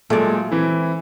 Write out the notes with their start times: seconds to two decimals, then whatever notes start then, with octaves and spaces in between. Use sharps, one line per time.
0.10 A#2 F#3 G#3 A3 D5
0.52 E3 C4 E4